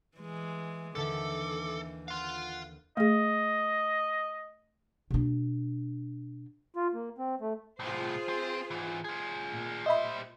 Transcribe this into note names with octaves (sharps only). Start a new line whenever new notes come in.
E3 G#3
D#2 D3 E3 A4 E5 D6
F5 F#5 C6
A3 G#4 D#5
B2 D4
F4
A#3
C4
A3
C2 A2 F4 G#4 C5
C4
G#2 E3
F4 G#4
A#2
G3 C5 D#5 E5 B5